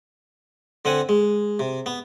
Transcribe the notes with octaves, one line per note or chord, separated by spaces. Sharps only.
D3 C4 F#5 G#5
G#3
C3
B3